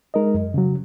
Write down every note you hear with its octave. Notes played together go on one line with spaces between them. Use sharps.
G#3 D#4 A#4 D#5
F#2
C#3 F#3